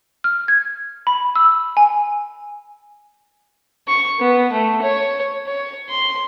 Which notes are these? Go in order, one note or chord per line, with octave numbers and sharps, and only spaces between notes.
F6
G#6
B5
E6
G#5
C#6
B3
A3
C#5
C#5
C6